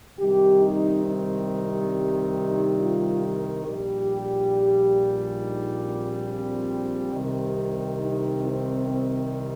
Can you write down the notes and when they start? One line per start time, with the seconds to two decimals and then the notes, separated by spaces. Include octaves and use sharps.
0.18 C2 C3 D#3 G3 G4
0.61 D#4
1.05 C4
2.36 D#4
2.79 F4
3.22 A#4
3.65 A#1 A#2 G3 G4
5.40 D#4
5.82 C4
6.26 C4
7.12 C2 C3 D#3 G3
7.99 D#4
8.43 C4
8.86 C4